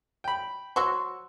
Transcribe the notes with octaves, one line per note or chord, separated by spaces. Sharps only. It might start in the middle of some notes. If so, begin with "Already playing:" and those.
G5 B5
F#3 F#4 C5 C#6 E6